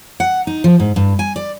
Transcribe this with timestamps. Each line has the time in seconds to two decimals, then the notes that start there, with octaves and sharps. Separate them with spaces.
0.20 F#5
0.47 D#4
0.64 F3
0.80 G#2
0.96 G2
1.19 G#5
1.36 D5